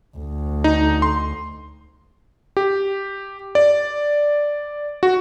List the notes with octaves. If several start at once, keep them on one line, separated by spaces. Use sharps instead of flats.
D2
D#4
C6
G4
D5
F#4